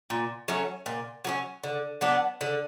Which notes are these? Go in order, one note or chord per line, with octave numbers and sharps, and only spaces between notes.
A#2
F#3 A3 C#4
A#2
F#3 A3 C#4
D3
F#3 B3 D4
D3